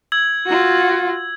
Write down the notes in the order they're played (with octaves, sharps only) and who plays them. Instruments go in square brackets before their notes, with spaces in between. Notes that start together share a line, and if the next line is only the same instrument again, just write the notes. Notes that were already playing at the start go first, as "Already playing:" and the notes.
[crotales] E6 G#6 F#7
[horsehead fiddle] F4 F#4